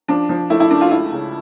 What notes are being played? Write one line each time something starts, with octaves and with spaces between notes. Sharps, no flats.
F3 D4
F3
A3 E4
E4
A3 D4
F4
C#2 E4
C#3